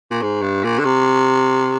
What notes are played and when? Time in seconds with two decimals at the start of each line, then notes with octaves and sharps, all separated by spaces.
0.11 A#2
0.22 G#2
0.42 G2
0.64 A#2
0.79 D3
0.85 C3